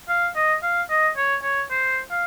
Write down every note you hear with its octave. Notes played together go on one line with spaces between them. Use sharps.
F5
D#5
F5
D#5
C#5
C#5
C5
F5